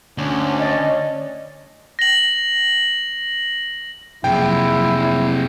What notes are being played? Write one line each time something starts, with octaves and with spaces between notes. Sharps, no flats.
D2 C#4 D4
D5 D#5
A#6 F#7
F2 C3 F#3 A#3 E4 G#4 G5